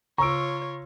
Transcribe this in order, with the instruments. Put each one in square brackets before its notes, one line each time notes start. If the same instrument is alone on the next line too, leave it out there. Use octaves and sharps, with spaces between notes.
[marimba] C#3 [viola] F4 C#5 [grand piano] A#5 E6 [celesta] C#6 D7